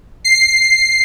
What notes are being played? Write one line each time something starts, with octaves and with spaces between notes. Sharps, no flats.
C7